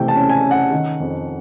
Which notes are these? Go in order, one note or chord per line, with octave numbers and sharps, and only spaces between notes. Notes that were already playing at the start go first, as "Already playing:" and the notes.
Already playing: C3 E3 A3 G5
A5
C#4
G#5
C#4
F#5
D#3
F2